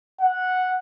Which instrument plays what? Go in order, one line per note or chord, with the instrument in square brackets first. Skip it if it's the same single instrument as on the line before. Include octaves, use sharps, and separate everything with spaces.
[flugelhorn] F#5